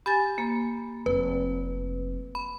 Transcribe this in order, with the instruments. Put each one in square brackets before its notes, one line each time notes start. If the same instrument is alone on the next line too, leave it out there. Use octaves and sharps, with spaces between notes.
[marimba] G4 G#5 A6 [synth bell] B5
[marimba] A#3
[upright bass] F1 [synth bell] B4
[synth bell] B5